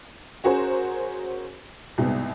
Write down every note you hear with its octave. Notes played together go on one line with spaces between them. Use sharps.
C#4 F#4 G#4 A#4 C5
C2 G#2 B2 B3